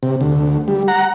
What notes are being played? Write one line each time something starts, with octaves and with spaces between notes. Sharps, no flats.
C3
D2
G3
F#5 A#5